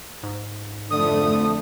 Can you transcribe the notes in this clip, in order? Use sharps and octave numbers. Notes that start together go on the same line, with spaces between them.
G#2
F2 D3 A3 D#6